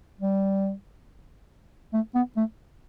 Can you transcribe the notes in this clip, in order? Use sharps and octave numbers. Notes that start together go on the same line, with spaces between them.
G3
A3
B3
A3